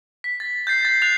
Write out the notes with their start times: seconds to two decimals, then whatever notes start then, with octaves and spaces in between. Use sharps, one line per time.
0.24 B6
0.40 A6
0.67 G6 A6 C7
0.85 A6 C7
1.02 F#6 A6 C7 F7